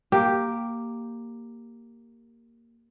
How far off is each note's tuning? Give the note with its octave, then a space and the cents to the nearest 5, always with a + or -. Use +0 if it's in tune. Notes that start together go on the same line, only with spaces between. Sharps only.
A#3 -5 G4 +0